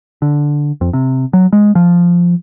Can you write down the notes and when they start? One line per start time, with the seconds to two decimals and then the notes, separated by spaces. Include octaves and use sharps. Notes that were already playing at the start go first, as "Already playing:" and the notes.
0.22 D3
0.81 F2
0.93 C3
1.33 F#3
1.53 G#3
1.75 F3